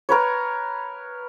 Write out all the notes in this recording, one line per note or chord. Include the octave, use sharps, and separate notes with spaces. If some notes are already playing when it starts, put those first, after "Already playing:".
A#4 B4 C#5